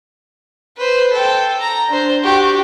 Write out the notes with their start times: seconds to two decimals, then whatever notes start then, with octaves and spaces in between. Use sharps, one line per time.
0.77 B4 C5
1.13 A4 G5
1.60 A#5
1.89 D4 C5
2.23 F#4 G4